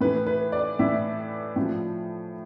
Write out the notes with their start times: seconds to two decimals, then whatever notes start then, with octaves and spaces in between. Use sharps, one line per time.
0.01 A2 E3 B4
0.26 B4
0.52 D5
0.79 A2 E3 E5
1.56 A2 F3